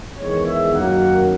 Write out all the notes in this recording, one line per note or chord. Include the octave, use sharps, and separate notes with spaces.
E2 D#3 G#3 C#5
E5
F#2 D#3 F#3 A#3 F#5